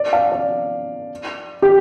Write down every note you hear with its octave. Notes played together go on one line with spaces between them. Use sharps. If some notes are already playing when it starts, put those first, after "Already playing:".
Already playing: D5
F5
D5
G4